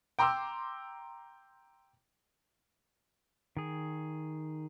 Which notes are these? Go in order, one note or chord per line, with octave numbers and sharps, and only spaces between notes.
G5 A#5 C6 D6 E6
D#3 G#4